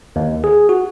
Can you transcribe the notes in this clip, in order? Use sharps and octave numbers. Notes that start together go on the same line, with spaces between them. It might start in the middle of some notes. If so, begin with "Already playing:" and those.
D#2
G#4
F#4